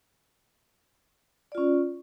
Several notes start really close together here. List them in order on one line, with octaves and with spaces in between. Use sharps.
D5 F4 C#4